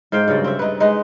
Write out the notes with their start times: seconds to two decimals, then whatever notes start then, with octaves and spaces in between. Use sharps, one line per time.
0.12 G#2 C5 F5 G5
0.28 G2 C#3 F#3 D5
0.44 C4 E5
0.59 D#4 B4
0.80 G#3 D#4 B4